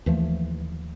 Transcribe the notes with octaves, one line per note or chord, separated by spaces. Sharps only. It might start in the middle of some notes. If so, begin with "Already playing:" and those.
D#2 E3 F3 A3